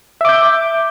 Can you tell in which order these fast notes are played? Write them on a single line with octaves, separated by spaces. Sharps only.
E5 D6 G6